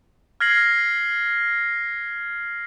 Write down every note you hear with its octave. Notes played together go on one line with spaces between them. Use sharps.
F6 G#6 A#6 C7 F#7